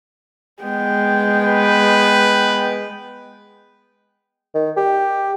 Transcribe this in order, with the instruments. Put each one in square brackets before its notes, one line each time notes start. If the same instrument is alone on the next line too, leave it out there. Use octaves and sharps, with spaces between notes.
[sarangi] G#3 [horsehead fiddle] B3 G5
[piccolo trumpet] B4
[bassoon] D#3
G4